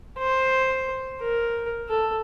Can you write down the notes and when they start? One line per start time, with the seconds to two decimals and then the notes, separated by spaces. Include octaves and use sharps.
0.19 C5
1.21 A#4
1.89 A4